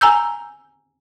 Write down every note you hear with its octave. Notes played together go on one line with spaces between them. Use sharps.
G#5 A#5 E6 G6